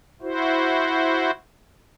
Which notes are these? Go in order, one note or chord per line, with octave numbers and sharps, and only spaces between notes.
E4 F#4 C5